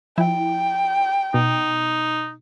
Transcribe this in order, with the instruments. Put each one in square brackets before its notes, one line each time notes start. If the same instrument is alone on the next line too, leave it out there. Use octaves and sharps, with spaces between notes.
[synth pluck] F3 E4 [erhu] G5
[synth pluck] B2 [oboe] D#4